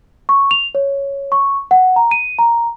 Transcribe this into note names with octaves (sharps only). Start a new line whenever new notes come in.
C#6
F7
C#5
C#6
F#5
A#5
D#7
A#5